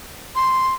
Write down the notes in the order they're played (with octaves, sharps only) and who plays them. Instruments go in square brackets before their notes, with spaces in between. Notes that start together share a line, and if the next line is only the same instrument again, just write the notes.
[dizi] C6